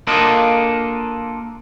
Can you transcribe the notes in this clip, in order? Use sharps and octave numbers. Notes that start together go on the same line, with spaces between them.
A#3 D4 F4 A4 A#4 D#5